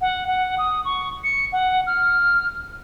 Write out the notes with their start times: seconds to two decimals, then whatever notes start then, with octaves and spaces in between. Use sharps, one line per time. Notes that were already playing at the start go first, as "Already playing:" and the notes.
0.01 F#5
0.27 F#5
0.58 D#6
0.85 C#6
1.24 C#7
1.52 F#5
1.87 F6